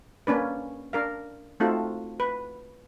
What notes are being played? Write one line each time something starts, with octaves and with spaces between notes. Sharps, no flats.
A#3 C#4 D4 B4
D4 A#4 F5
A3 C4 D#4 F4 F#4 A4
B4